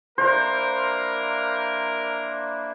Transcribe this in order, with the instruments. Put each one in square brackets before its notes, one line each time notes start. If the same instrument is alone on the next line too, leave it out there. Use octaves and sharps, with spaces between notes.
[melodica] A#3 D4 E4 [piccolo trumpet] A#4 [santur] C5